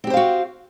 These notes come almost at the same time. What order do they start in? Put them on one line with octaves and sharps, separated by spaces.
C4 G4 C5 F5 F#4